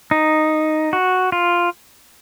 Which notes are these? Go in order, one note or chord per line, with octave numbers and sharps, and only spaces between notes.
D#4
F#4
F4